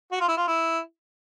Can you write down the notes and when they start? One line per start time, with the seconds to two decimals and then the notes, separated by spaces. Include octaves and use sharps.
0.12 F#4
0.20 F4
0.28 E4
0.37 F4
0.47 E4